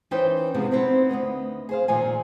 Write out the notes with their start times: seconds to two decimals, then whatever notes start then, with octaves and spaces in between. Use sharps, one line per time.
0.11 E3 C#4 D#4 B4 C5 G5
0.54 C3 F3 G#3 B3 C4 G#4
0.71 B3 C4 D#4 E4 C5
1.09 D2 A#2 B3 D#5
1.69 G#4 C5 F5
1.88 A#2 D#3 F3 G#5